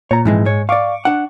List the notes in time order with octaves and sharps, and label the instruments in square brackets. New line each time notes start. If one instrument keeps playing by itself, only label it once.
[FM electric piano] A#2 [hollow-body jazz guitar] C#5 A#5
[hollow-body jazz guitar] F2 E3 G#3 [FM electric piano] G#2
[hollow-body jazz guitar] G#3 C#5
[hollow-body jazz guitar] D5 F5 [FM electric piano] C#6 D6
[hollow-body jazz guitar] D4 F#5